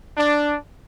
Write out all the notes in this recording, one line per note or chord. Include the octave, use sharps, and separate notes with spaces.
D4